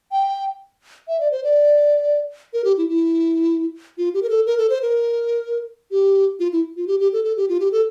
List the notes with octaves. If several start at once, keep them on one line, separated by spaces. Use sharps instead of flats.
G5
E5
D5
C5
D5
A#4
G4
E4
E4
F4
G4
A#4
A4
A#4
A4
C5
A#4
G4
F4
E4
F4
G4
G4
A4
A4
G4
F4
G4
A4